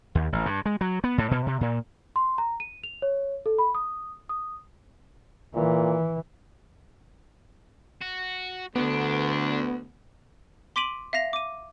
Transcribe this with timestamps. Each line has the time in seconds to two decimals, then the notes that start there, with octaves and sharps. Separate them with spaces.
0.15 D#2
0.32 A1
0.46 G2
0.66 G#3
0.81 F#3
1.04 B3
1.18 A2
1.31 B2
1.46 C3
1.61 A#2
2.16 C6
2.38 A#5
2.60 D#7
2.84 F7
3.02 C#5
3.46 A4
3.58 B5
3.75 D#6
4.29 D#6
5.55 A#2 E3
8.02 F#4
8.76 D2 D3 B3 D4
10.76 C6 D6 B6 D7 D#7 F#7
11.13 E5 F5 A#6 F7
11.33 D6 D#7